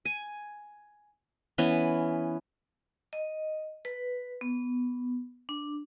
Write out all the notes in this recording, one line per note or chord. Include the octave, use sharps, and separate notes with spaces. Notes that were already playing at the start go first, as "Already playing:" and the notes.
G#5
E3 B3 C#4
D#5
B4
B3
D4